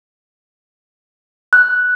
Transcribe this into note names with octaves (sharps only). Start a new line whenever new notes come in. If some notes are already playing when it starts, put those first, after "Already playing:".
F#6